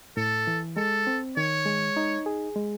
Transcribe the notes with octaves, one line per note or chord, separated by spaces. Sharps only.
A2 A4
E3
G#3 A4
C4
D#3 C#5
G#3
D#4
G#4
G#3